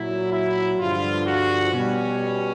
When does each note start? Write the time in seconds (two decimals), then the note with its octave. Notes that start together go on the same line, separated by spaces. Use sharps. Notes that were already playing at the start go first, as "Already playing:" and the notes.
Already playing: A#2 F#3 E4
0.31 E4
0.78 G2 D3 F3 F4
1.26 F#4
1.72 B2 G3 C#4